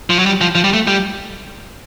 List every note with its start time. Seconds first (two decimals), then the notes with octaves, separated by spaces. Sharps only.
0.10 F3
0.19 F#3
0.26 G3
0.41 F3
0.55 F3
0.64 G3
0.73 A3
0.88 G3